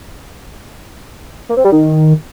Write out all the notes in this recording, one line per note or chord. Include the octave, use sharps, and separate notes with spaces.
A#3
C4
G3
D#3